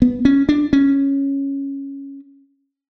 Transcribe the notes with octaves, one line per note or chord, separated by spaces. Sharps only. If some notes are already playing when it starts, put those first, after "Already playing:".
B3
C#4
D4
C#4